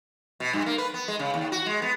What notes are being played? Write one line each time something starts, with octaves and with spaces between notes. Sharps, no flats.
B2
G2
A#3
B4
B3
G#3
C#3
D#2
F#4
G#3
B3